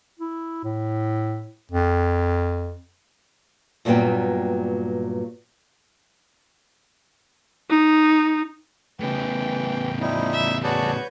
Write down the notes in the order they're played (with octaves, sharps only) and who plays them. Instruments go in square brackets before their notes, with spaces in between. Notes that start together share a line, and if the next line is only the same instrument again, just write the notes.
[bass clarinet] E4
A2
F2
[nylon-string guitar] G2 A#2 F#3 G3 B3 G5
[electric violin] D#4
[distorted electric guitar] A2 C#3 [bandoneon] E3 [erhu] G5
[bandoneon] F3 G3 [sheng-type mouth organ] D#4 E4
[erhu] E5
[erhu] F#4 [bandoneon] G#4 D5 A5 [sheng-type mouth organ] B4 C#5 G6